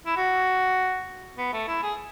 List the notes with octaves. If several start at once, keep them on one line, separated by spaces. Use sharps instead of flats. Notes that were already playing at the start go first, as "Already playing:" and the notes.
E4
F#4
B3
A3
E4
G#4